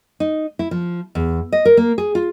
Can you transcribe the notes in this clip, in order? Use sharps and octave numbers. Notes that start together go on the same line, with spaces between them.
D#4
E4
F3
E2
D#5
A#4
A#3
G#4
F4